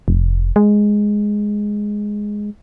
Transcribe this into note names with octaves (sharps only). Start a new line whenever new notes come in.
F1
G#3